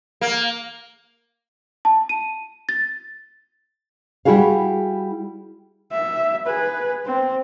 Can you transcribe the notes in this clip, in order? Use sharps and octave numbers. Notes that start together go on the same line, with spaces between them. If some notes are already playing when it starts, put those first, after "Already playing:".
A#3
A5
D#7
A6
G3 E4 F#4 G#4 F5
E5
G#4 B4
C4